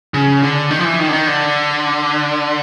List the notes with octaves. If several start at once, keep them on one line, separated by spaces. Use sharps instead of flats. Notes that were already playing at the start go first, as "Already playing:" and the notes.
C#3
D3
D#3
F3
E3
D#3
D3
D#3
D3